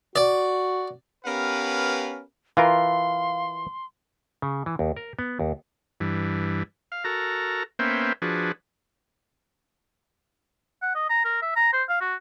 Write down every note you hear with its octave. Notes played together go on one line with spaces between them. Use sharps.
F#4 D5
B3 C#4 G4 A#4 B4 F5
E3 F4 A#4 F5 C6
C#3
E3
D#2
A#4
B3
D#2
G2 E3
F5
F#4 A4 A#4 A#5
A#3 B3 C#4 C5 E5 G5
F3 D4 F#4 G#4 B4
F#5
D#5
A#5
A#4
E5
A#5
C5
F5
F#4